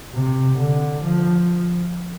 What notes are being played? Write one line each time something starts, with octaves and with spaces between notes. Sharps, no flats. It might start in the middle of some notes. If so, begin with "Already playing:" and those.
C3
D3
F3